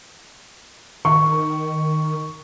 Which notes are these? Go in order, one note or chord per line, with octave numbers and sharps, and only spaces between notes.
D#3 C#6